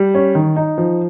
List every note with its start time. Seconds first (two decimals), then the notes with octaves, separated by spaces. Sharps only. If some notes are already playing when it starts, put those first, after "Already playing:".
Already playing: G3
0.15 C#4
0.35 D#3
0.56 D#4
0.78 F3